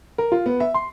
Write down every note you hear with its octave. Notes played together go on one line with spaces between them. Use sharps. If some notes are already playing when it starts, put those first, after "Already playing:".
A#4
F4
B3
E5
C6